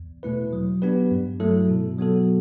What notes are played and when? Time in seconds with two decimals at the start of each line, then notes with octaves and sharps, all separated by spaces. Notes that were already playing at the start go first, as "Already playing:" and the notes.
Already playing: E2
0.23 B2 A3 E4 B4
0.53 F#3
0.82 B3 D4 G4 B4
1.11 G2
1.40 F#3 A3 E4 A4
1.69 B2
1.99 F#3 B3 F#4 A4